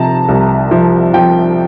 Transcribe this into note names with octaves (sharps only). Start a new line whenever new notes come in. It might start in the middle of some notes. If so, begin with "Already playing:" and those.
Already playing: C3 F3 A5 A#5
C2
F3
F3 G5